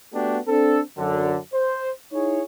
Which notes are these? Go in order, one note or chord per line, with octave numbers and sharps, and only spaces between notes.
A3 B3 D4 F#4 G4
C4 D4 A4
F#2 D3
C5
D#4 E4 G#4 C#5